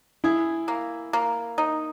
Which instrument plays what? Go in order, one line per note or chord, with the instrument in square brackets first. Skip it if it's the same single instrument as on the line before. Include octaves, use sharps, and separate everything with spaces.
[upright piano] E4 [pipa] G#4
[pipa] A#3
A#3
D#4